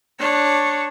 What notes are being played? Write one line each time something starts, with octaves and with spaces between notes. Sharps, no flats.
D4 C#5